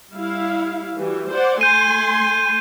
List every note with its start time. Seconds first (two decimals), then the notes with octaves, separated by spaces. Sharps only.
0.11 G3 E4 F5
0.98 E3 G3 F#4
1.31 C5 D5 F#5
1.61 A3 G#5 C6 G6 D#7